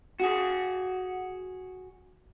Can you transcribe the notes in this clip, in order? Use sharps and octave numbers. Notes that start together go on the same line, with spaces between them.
F#4 G#4